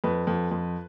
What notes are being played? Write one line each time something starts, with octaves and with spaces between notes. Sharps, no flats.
F2 B4
F2
F2